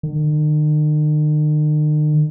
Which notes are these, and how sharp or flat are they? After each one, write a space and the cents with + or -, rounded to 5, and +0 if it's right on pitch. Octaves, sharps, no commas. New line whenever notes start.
D#3 -45